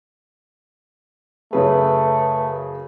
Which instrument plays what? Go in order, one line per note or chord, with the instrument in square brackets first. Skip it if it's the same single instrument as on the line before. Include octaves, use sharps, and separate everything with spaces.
[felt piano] F#2 C#3 G#4 [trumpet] A3 [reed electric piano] B4